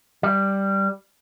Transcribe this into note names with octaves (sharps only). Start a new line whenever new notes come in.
G3